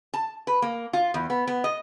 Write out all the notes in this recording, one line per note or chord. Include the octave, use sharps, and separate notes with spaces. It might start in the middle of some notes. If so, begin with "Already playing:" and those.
A5
B4
A#3
F4
E2
B3
B3
D#5